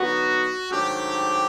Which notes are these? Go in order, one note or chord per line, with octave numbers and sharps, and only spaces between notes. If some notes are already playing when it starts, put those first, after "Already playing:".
Already playing: D3 F#3 B3 D#4 F#4
G#2 D#3 F#3 A3 D4 G4